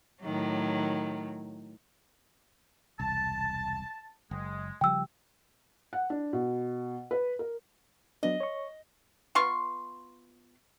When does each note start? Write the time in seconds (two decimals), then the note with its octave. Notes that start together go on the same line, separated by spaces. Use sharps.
0.22 A2 D#3 F#3
3.00 E1 C2 A5
4.31 F#1 G#3
4.81 C#3 F3 G3 G5 E6
5.93 F#5
6.10 D4
6.33 B2
7.11 B4
7.39 A#4
8.23 F#3 B3 D4 D#5
8.40 C#5 C#6
9.35 B3 F4 C6 C#6